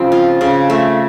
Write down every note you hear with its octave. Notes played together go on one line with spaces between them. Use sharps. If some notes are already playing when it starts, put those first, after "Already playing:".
Already playing: C#3 F3 C4
F4
C#3
A3